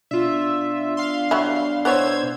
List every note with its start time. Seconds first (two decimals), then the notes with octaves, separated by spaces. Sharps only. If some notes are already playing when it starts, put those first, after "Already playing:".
0.11 B2 D4 F4 E5
0.97 F5 C6
1.31 F#3 G3 E4
1.85 B3 E4 C5 C#5 E6 G#6